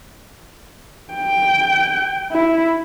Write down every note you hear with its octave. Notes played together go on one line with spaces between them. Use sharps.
G5
E4